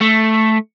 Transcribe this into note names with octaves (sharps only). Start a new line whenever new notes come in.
A3